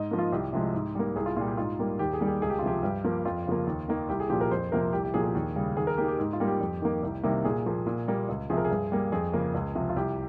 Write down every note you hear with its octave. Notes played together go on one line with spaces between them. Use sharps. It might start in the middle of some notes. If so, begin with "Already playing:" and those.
Already playing: G#2 D#5
F3 A#3
F4
C2 G4
C3 F3 G#3
G#2
G3 A#3
C2 G#4
F4
A#2 G3 F4
G4
G#2 F4
G3 A#3
D#2 G4
G#4
D#3 G3 A#3
G#4
C#2 G#4
G4
F4
C3 F3 G4
G2
F3 A#3
F2 F4
C#3 F3 A#3
D#2
D#3 A#3
C2 G4
G#4
A#2 F3 G4
A#4
F2 C5
C3 F3 A#3 A#4
C2 G4
G4
A#2 F3 G#4
G#4
D#2
C#3 G3
D#2 G#4
A#4
D#3 A#3 G4
G4
G#2
F4
G3 A#3
G4
F2
D#3 A#3
C2
C3 D#3 G3 A#3
A#2 G#4
F3 A#3
A#2
G3 A#3
C#2
C3 F3 G#4
A#4
G#4
G2
G3 A#3
F2 G#4
C#3 F3 A#3
C#2
C3 F3
F4
C2 G4